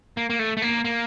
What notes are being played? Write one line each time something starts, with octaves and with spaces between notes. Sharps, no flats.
A#3
A#3
A3
A3
A#3
A#3